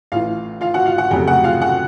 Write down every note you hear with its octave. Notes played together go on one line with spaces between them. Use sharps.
A1 A2 E3 F4 F5
F4 F5
F#4 F#5
F4 F5
F#4 F#5
F1 F2 C#3 F#3 A3 G4 G5
F#4 F#5
F4 F5
F#4 F#5